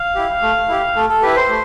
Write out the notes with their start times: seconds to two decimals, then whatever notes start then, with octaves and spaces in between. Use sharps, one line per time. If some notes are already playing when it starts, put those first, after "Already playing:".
Already playing: F5
0.15 E4 G4
0.42 A3
0.68 E4 G4
0.96 A3 A4
1.09 A4
1.22 E4 G4 B4
1.36 C5
1.49 A3